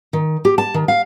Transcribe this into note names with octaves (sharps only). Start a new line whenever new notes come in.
D#3
G4
A5
D#3
F5